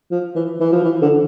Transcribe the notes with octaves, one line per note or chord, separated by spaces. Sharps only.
F3
E3
E3
F3
E3
D3